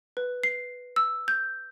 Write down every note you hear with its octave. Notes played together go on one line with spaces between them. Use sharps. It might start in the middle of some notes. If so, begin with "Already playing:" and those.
B4
C7
E6
G6